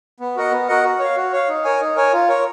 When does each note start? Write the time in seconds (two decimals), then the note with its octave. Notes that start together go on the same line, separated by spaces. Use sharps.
0.20 B3
0.36 F#4 A#4 D#5 F#5
0.51 B3
0.68 F#4 A#4 D#5 F#5
0.84 F#4
1.00 C#5 F5
1.16 F#4
1.33 C#5 F5
1.49 D#4
1.64 A#4 C#5 G#5
1.81 D#4
1.96 A#4 C#5 G#5
2.13 F4
2.28 A#4 C#5